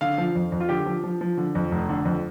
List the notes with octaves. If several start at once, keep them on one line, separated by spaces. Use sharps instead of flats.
D3 F5
F3
F2
F2
F4
D3 G4
F3
F3
F3
D3
F2
F1
D3
F2